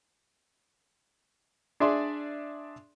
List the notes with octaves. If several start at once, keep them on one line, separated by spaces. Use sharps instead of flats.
D4 G#4 D5 E5 C6